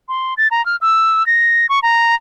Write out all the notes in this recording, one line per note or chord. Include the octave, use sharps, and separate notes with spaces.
C6
A6
A#5
F6
E6
A#6
C#6
A#5